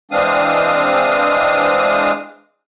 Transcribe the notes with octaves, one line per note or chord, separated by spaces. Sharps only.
E3 G#3 C4 D4 F5 D#6